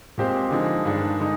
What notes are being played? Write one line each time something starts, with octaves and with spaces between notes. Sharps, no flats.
A#2 G#3 C4 G4 C5
D3 F3 G#3 D#4
G2 D#3 G#3 D4
D3 G#3 D#4